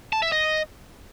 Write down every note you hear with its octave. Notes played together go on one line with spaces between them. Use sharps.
A5
E5
D#5